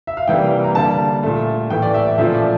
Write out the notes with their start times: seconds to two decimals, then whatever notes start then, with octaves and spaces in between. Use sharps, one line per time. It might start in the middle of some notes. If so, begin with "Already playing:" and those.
0.07 E5
0.17 F5
0.28 C3 E3 G3 A#3 G5
0.64 A#5
0.75 D3 G3 A#3 A5
1.23 A#2 A3
1.70 A2 E3 A3 G5
1.82 D5
1.94 E5
2.06 D5
2.18 A#2 F3 A3 E5
2.34 D5